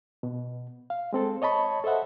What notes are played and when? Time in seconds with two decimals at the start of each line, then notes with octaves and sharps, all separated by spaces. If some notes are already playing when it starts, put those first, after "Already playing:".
0.23 B2
0.90 F5
1.13 G#3 C4 A4
1.42 C#5 D#5 A5 B5 C#6
1.84 A4 C5 D#5 E5 F#5